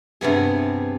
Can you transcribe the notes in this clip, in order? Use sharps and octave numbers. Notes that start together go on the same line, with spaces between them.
G2 C3 B3 G#4